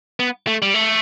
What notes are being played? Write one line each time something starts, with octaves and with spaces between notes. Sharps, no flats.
B3
A3
G3
A3